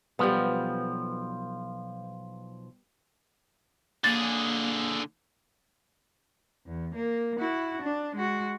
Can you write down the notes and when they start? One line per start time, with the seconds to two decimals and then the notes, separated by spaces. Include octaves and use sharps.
0.19 B1 F3 G3 B3
4.04 D3 A#3 G#4 A6
6.66 E2
6.95 A#3
7.39 E4 F#4
7.82 D4
8.16 G#3 F#4